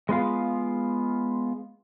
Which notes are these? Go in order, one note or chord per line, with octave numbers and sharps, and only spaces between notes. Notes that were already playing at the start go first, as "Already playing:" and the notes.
G#3 B3 F4 F5